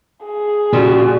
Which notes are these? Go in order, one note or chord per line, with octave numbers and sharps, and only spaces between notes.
G#4
A#2 C#3 F3 G3 F#4